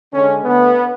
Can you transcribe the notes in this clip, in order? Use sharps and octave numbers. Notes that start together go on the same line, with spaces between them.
D3 G#3 C#4
D3 A3 B3